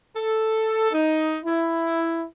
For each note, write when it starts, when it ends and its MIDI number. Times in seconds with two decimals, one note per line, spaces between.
0.16 0.91 69
0.92 1.37 63
1.44 2.25 64